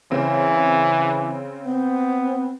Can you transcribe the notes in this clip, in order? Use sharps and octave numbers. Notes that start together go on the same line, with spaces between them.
C#3 E3 C4
B3 C4